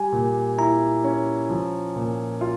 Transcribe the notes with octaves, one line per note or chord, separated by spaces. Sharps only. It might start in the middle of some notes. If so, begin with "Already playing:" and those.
Already playing: G3 G#5
A#2
E4 A#5
C#4
F3
A#2
F4